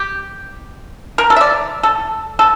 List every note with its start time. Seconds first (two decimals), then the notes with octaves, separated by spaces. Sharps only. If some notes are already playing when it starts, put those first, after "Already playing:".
Already playing: G4
1.18 A#4
1.30 A4
1.36 E5
1.41 D5
1.83 A4
2.39 A4